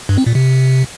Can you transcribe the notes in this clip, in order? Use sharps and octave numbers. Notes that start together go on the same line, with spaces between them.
G2
C4
A#2
C3